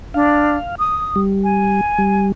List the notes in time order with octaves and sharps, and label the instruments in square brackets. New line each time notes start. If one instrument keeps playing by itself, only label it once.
[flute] D4 [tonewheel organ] F5
[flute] D#6
[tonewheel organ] G3
[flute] G#5
[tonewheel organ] G3